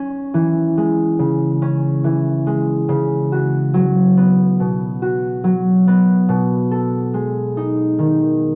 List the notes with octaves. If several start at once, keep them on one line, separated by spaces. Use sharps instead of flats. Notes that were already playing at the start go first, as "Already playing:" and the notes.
Already playing: C#4
E3
G#3
C#3
C#4
E3
G#3
C#3
F#4
F#3
B3
B2
F#4
F#3
B3
B2
A4
G#3
D#4
D#3